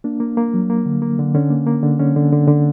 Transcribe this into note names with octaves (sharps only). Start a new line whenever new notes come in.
A#3 D4
A#3
A#3
F#3
A#3
D3
A#3
D3
D3 C#4
A#3
A#3
D3
D3 C#4
D3
D3
D3